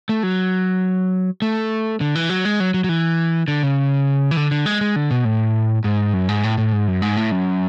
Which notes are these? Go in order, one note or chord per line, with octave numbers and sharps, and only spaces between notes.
A3
F#3
A3
D3
E3
F#3
G#3
F#3
F#3
F#3
E3
D3
C#3
E3
D3
D3
G#3
G#3
D3
B2
A2
G#2
F#2
G#2
A2
A2
G#2
F#2
G#2
A2
F#2